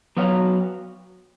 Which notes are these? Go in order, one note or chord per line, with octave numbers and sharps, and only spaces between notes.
F#3 B3 F#4 C#5 F5